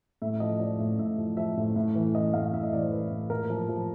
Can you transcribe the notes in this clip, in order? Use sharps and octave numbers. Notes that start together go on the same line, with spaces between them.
A2 E5
F3 D#5
F3 D5
A2
A2 E5
F3
F3 E5
A2
A2
E3
E3 D#5
A2 F5
A2 E5
D#5
E3 D5
C5
E3 B4
A2
A#2 A#4
F3
F3